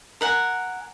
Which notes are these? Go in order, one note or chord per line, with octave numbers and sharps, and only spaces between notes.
A#4 F#5 G#5